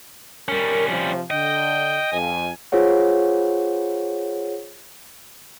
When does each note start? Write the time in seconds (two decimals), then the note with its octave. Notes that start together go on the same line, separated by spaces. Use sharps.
0.48 G3 C#4 A#4
0.87 C3 F3
1.30 D3 D#5 G5
2.13 F2 G#5
2.72 F4 G#4 C5 C#5 F#5